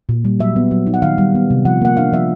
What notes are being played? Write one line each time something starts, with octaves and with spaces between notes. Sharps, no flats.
A#2
G3
F#3 E5
B3
F#3
D#4
F#5
D#3 F5
G3
B3
C3
F3 F#5
A#3 F#5
D4 F5
F3 E5